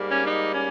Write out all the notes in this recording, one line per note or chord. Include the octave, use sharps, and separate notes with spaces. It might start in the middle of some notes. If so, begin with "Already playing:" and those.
Already playing: G#2 G3 A#3
C#4
D#4
C#4